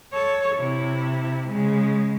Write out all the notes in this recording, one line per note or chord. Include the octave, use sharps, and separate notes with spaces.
A4 C#5
C3 E4
C#3 G#3